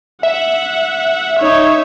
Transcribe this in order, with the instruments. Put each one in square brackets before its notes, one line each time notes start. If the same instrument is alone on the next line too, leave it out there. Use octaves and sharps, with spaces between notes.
[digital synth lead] E5 [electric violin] F#5
[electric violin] D#4 C#5